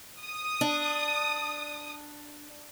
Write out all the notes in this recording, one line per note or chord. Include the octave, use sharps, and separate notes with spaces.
D#6
D4